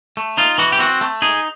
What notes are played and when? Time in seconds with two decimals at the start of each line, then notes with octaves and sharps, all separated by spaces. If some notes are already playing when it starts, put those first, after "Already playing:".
0.17 A3
0.37 D#4 F4
0.58 E3 F#4
0.72 G4
0.79 C4 F#4
1.01 A3
1.22 D#4 G#4